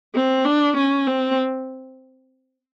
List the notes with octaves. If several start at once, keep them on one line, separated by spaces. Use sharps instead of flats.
C4
D4
C#4
C4